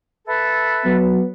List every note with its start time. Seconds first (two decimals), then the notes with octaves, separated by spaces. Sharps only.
0.25 A4 B4 E5
0.85 F#3 B3